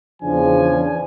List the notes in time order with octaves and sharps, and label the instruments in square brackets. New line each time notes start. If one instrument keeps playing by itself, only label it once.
[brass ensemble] E2 C#3 F3 D4 G#5